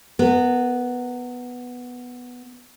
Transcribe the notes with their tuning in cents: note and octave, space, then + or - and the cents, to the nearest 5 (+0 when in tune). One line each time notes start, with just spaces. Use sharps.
B3 +0 A#4 -25